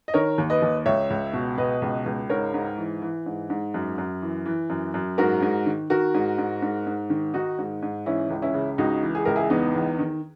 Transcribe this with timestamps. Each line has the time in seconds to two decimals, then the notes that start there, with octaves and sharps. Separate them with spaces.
0.08 D#5
0.14 D#3 A#4 C#5
0.38 D#2
0.50 B4 D#5
0.62 D#2
0.86 C#2 C#5 E5
1.10 C#2
1.33 B2
1.58 B2 B4 D#5
1.82 C#2
2.06 C#2
2.30 G#2 A#4 C#5
2.54 G#2
2.78 E3
3.02 E3
3.26 G#2
3.50 G#2
3.74 F#2
3.98 F#2
4.22 E3
4.46 E3
4.70 F#2
4.94 F#2
5.18 G#2 F#4 A#4
5.42 G#2
5.66 D#3
5.90 D#3 F#4 A#4
6.14 G#2
6.38 G#2
6.62 G#2
6.87 G#2
7.10 D#3
7.34 D#3 D#4 F#4
7.58 G#2
7.82 G#2
8.06 E3 C#4 E4
8.30 C#2
8.42 C#4 E4
8.54 C#3
8.78 C#2 D#4 F#4
9.03 E3
9.15 G#4
9.25 C#2 A#4
9.36 E4 G#4
9.50 E2 B3 D#4
9.74 E2
9.99 D#3